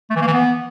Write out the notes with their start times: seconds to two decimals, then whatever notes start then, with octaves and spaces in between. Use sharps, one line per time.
0.10 A3
0.16 E3
0.22 A#3
0.27 E3
0.33 B3